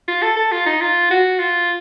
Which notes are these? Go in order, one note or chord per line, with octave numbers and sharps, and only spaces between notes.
F4
A4
A4
F4
D#4
F4
F#4
F4